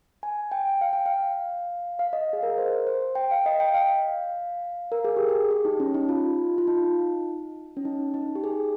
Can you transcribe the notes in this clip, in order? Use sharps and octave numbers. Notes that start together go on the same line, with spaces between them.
G#5
G5
F5
G5
F5
F5
D#5
G#4
A#4
C5
C5
G5
F5
D#5
G5
F5
A#4
G#4
G4
G#4
G4
D#4
C#4
D#4
F4
F4
D#4
C#4
D#4
D#4
G4
G#4